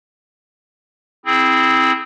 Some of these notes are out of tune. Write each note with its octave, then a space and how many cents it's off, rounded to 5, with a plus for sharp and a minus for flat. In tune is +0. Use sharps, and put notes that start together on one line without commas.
C4 +0 E4 -15 G#4 +0